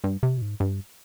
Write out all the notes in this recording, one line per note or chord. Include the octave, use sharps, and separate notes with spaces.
G2
C3
B2
G#2
G2